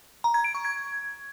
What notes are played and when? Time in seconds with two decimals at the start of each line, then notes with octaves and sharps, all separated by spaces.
0.24 A#5
0.34 G#6
0.44 D7
0.55 C#6
0.65 G#6